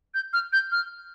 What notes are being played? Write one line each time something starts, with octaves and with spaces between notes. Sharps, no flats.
G6
F6
G6
F6